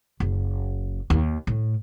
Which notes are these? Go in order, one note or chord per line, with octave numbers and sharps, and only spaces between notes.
F#1
D#2
A2